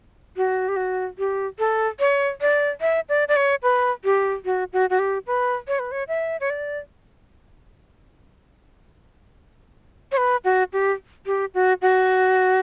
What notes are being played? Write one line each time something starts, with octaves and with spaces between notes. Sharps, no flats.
F#4
G4
F#4
G4
A4
C#5
D5
E5
D5
D5
C#5
B4
G4
F#4
F#4
F#4
G4
B4
C#5
B4
C#5
E5
C#5
D5
C#5
B4
F#4
G4
G4
F#4
F#4